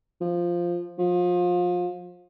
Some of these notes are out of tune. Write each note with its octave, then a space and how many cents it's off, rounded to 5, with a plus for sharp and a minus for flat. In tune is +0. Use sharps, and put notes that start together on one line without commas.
F3 -5
F3 +30